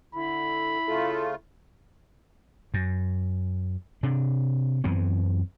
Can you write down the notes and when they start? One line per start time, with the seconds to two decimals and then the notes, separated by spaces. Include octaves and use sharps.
0.13 D3 E4 B5
0.88 C#3 A3 F4 A4
2.74 F#2
4.03 C3 D4
4.84 F#2 E3 B3 C4